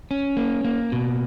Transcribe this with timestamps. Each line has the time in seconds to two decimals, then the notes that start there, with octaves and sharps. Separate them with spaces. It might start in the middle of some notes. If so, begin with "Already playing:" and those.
0.11 C#4
0.37 A#3
0.64 A#3
0.92 B2